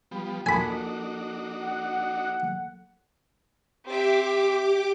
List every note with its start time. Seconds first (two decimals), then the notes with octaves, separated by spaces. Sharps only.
0.11 F3 G3 B3
0.46 F3 A#3 D4 D#4 F#4 A4 G#5 B5
1.63 F#5
3.85 C4 G4 E5 D6